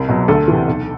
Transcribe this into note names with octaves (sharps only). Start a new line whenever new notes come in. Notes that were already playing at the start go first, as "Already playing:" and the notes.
Already playing: C2
B2 F#3
D2 A4
C3 E3
B1